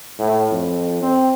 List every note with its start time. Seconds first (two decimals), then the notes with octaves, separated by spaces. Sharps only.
0.19 A2
0.51 F2
1.02 C4